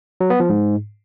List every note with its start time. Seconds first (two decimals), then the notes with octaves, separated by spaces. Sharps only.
0.21 F#3
0.30 B3
0.40 F3
0.50 G#2